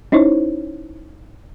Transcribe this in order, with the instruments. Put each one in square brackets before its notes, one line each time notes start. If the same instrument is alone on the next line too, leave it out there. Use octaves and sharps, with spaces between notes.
[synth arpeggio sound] C#4 D#4 E4 C5 C#5